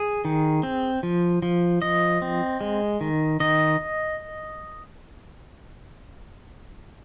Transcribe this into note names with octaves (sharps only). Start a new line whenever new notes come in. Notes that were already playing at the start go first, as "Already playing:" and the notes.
Already playing: G#4
D#3
C4
F3
F3
F3 D#5
C4
G#3
D#3
D#3 D#5